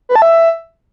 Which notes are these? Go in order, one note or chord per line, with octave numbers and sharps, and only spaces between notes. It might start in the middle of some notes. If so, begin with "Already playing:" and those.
B4
A5
E5